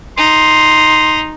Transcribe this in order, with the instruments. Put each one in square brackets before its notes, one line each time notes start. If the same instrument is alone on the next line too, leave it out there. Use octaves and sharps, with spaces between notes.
[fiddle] D#4 [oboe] C6